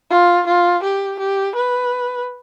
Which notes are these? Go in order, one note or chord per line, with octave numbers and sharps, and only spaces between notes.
F4
F4
G4
G4
B4